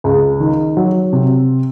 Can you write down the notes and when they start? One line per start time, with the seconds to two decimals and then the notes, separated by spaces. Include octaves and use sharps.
0.04 C#2
0.40 D#3
0.77 F#3
1.13 C3